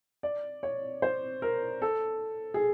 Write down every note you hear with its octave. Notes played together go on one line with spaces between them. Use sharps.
D5
C#5
C5
A#4
A4
G#4